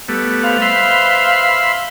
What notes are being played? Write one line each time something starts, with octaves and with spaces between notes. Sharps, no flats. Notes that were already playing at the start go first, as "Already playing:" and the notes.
G3 A3 B3
B4 C5 F5
E5 B5 C6